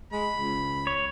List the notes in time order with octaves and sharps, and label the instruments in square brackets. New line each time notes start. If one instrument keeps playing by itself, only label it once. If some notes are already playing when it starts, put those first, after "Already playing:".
[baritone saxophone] G#3 [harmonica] B5
[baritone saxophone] C#2
[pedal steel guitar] C#5